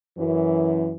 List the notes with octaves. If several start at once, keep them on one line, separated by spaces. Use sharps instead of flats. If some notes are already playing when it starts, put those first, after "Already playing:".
F#2 E3